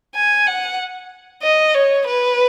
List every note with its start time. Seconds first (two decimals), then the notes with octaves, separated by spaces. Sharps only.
0.15 G#5
0.47 F#5
1.43 D#5
1.74 C#5
2.06 B4